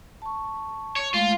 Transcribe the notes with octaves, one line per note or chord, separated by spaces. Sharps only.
A5 C#6
C#5
G#3 A3 F4 F5